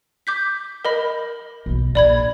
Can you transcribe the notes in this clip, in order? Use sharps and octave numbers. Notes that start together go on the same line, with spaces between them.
D6 G6 B6
A#4 D#5 B5
B1 D#4
A#1 D5 B5 G#6